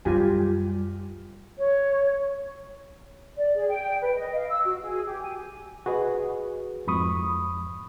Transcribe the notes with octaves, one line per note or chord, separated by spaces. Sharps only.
F#2 G3 F4 G4 G#5
C#5
D5
G#4
G5
B4
D#5
F5
E6
F#4
G#4
G4
G#5
F#4 G#4 B4 D#5
F2 G#2 B5 C#6 D#6